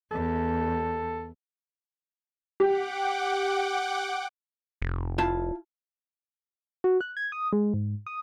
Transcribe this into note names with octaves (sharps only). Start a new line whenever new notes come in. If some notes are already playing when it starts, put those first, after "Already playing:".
E2 A4
G4 F#5 G5 D6
F1
E4 F4 A5
F#4
F#6
G#6
D#6
G#3
G#2
D#6